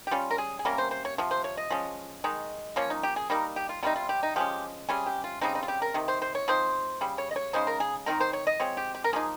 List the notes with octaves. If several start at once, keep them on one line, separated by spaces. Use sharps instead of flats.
G4
G3 C#4 F4
A#4
G#4
G#4
C3 G3 A#3 C#4 A#4
C5
C5
C#5
C3 F3
C5
C#5
D#5
F3 G#3 C#4
D#3 G#3 D#4
F3 A#3 C#4 C#5
D#4
G4
G#4
G3 A#3 D#4 A#4
G4
F4
C3 G3 C4 D#4 F4
F4
G4
D#4
F3 G#3 C#4 G4
C3 G3 C#4 G#4
G4
F4
C#3 G3 C4 D#4
D#4
F4
G4
A#4
C3 D#3
C5
C5
C#5
F3 C4 D#4 C5
C#3 G3
C#5
D#5
C#5
C#3 G#3 D#4 C5
A#4
G#4
D#3 G#3 C4 D#4 A#4
C5
C#5
D#5
F3 G#3 C4 C#5
G4
G4
A#4
F3 A#3 D#4 G#4